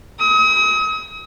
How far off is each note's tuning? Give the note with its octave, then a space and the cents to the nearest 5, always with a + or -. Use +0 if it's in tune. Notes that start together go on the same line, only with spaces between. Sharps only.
D#6 +40